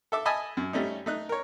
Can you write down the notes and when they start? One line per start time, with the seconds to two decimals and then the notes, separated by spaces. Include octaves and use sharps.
0.12 A4 E5 D6
0.26 D#5 E5 G#5 A5 B5 D#6
0.57 F#2
0.73 G3 A3 C#4 D#4
1.06 A3 D#4 F#6
1.29 A#4 C#5